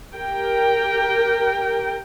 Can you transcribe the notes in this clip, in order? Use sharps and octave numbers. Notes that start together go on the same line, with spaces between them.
G4 A#4 G5